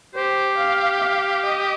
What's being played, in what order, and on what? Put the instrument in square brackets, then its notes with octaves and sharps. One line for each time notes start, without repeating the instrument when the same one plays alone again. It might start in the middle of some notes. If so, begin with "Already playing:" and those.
[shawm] G4 [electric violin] C5
[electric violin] F5
F5
D#5